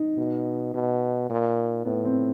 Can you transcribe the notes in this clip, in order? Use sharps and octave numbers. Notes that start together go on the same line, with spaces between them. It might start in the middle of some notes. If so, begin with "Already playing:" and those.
Already playing: D#4
B2
B2
A#2
A2 B3
C4